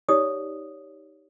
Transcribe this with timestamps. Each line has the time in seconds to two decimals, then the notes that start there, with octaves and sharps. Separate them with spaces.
0.09 D#4 G4 C#5 D5 D#6